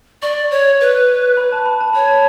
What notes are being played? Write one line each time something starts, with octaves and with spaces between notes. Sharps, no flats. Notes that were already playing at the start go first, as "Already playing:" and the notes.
D5 C#6
C#5
B4
B5
A5
B5
A5
C#5 B5
A5